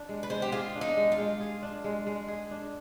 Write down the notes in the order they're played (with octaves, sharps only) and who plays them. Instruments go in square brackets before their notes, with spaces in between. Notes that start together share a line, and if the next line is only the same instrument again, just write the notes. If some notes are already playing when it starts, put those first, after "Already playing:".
Already playing: [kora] D4
G#3
[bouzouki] B4
[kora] G#3 [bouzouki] C5
[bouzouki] G4
[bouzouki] F4 [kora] G#4
[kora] D4
[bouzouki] D#4
[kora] G#3
[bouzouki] F4
[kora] G#3
G#4
D4
G#3
G#3
G#4
D4